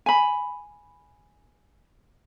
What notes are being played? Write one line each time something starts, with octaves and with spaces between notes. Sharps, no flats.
G#5 B5